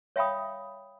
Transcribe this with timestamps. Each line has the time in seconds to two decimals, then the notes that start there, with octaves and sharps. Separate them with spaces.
0.16 C#5 E5 F5 G5 B5 D#6